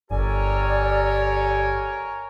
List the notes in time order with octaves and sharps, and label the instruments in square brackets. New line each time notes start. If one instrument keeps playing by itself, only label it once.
[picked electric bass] G1 [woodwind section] G4 A4 G#5 [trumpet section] A#4 C#5 [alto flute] D5